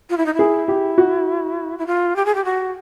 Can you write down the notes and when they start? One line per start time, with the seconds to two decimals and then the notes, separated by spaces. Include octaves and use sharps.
0.10 F4
0.17 E4
0.26 D#4
0.34 E4
0.39 G#4
0.68 G4
0.98 F#4
1.78 E4
1.87 F4
2.16 G4
2.25 G#4
2.35 G4
2.45 F#4